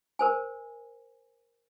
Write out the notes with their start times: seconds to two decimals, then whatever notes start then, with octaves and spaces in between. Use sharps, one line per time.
0.19 A#4 C5 G#5